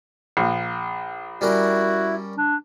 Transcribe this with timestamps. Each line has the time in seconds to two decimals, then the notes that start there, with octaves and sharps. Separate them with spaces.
0.37 A#1
1.41 G3 C#4 E4 F#4 A#4
2.38 D4